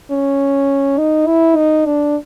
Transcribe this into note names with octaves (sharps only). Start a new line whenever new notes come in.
C#4
D#4
E4
D#4
D4